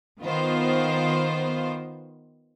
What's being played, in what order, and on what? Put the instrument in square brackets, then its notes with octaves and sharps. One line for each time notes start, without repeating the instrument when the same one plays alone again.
[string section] D#3 B3 F4 C5